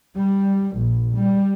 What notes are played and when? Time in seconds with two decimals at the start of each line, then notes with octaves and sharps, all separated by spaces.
0.15 G3
0.78 A#1
1.16 G3